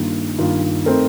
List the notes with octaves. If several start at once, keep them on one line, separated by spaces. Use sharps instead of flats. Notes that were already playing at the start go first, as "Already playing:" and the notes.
Already playing: G2 D#3 A#3 F4
G2 D#3 A#3 F4
A3 C4 D#4 A#4